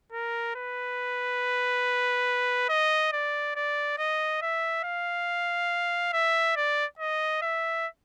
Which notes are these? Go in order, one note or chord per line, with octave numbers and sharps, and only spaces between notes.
A#4
B4
D#5
D5
D5
D#5
E5
F5
E5
D5
D#5
E5